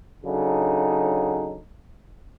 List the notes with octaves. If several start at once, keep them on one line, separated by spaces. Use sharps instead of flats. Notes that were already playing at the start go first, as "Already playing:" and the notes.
C#3 F#3 D4 D#4 A4